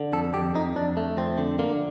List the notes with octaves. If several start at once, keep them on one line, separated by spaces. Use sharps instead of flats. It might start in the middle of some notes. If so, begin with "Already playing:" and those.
Already playing: D3
F2 A4
F2 G4
F2 D#4
F2 D4
A3
F2 C4
D3
D3 A#3